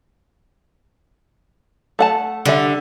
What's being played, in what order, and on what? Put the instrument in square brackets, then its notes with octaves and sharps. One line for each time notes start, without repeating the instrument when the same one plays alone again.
[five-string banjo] A3 F#5 A5
[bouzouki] D3 [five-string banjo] G3 E5